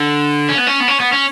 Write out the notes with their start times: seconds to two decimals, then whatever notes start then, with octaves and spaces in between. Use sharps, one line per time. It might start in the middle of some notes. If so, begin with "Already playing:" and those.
Already playing: D3
0.49 C#4
0.58 B3
0.67 C#4
0.80 B3
0.88 C#4
1.00 B3
1.12 C#4